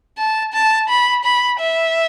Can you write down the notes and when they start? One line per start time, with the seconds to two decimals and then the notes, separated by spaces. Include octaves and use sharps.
0.18 A5
0.53 A5
0.89 B5
1.24 B5
1.59 E5